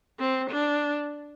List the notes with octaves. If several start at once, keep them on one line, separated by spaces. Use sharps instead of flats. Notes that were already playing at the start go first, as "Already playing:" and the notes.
C4
D4